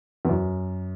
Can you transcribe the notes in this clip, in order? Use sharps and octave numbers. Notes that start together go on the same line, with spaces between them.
E2
F#2